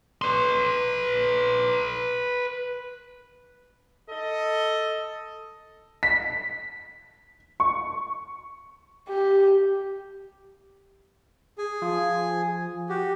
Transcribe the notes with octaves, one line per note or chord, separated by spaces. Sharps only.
B4 C6
A4 D#5
B6
C#6
G4
G#4 G#5
F3
F#4 G4